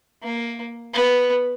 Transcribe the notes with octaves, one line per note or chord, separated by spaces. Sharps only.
A#3
B3